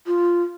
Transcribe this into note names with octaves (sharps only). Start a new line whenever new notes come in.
F4